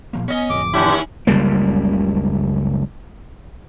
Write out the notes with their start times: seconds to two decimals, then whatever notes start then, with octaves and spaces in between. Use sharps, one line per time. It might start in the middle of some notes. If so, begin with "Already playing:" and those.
0.13 A#2 F3 A#3
0.28 B3 C#4 D#5
0.50 D1 F2 D6
0.73 D#2 C#4 D4 E4 G4
1.27 F#1 C#2 G3 A#3